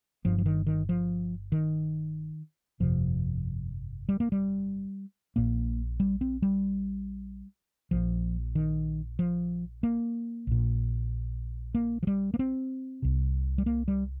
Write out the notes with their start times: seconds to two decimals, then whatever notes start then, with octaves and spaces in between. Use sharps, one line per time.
0.25 G1 G2 F3
0.38 F3
0.46 D#3
0.67 D#3
0.89 F3
1.52 D#3
2.80 G1 F2 C3 F3
4.09 G3
4.20 A#3
4.32 G3
5.36 A#1 A#2 A#3
6.00 G3
6.21 C4
6.42 G3
7.91 A#1 A#2 F3
8.55 D#3
9.19 F3
9.83 A#3
10.47 A#1 A#2
11.75 A#3
12.03 F3
12.07 G3
12.34 A#3
12.39 C4
13.02 C2 C3
13.58 G3
13.66 A#3
13.88 G3